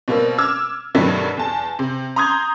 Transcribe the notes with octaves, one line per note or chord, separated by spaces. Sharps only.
B2 G3 A#3 C4
D6 E6 F6 G#6
G2 B2 D#3 F#3 G3 A3
E2 A5
C3
A#5 C6 D#6 G6 G#6